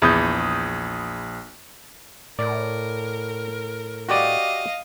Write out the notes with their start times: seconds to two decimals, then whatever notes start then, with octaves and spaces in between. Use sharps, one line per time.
0.02 A#1 E2 D#6 G6
2.39 A2 A#4 D5
4.09 F#4 G4 D5 D#5 F5